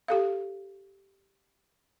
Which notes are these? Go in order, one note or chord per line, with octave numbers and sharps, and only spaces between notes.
G4 A4 F5